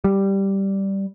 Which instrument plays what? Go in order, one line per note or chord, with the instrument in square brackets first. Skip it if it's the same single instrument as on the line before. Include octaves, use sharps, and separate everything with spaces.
[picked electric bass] G3